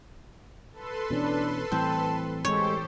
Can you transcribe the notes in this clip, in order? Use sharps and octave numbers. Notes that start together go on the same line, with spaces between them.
A4 B4 C6
B2 E3 C#4 D4
A2 E3 G3 C4 A5
G#3 G4 A4 C5 C#5